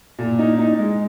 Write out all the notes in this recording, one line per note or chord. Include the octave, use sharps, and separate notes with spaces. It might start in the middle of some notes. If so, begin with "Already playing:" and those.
A#2
D#4
D#4
G#3